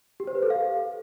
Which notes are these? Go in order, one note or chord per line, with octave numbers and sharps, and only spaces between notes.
G4
C5
B4
A4
F5